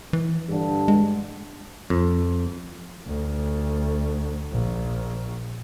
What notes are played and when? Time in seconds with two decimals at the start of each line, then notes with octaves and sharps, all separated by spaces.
0.13 E3
0.49 G2 D3
0.88 G#3
1.90 F2
3.07 D2
4.52 A#1